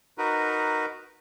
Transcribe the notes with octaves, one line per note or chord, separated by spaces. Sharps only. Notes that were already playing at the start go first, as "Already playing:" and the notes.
D#4 F#4 A#4 B4